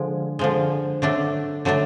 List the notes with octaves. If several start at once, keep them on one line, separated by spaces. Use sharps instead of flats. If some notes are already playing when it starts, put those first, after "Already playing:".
Already playing: D3 F3 G#3
D3 F3 G#3
D3 F#3 A3 D4
D3 F#3 A3 D4